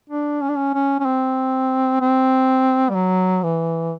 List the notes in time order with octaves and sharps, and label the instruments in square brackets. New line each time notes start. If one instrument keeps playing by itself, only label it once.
[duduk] D4
C#4
D4
C#4
C#4
C#4
C4
C4
G3
F#3
E3